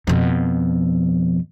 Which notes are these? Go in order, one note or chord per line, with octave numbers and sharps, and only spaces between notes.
F2 B2